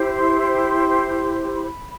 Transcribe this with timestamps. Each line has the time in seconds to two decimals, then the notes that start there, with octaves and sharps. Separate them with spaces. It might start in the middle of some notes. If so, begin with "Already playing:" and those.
Already playing: E4 G4 C5
0.10 C6
1.53 B5